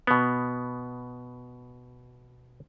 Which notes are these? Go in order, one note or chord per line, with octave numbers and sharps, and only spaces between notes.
B2 B3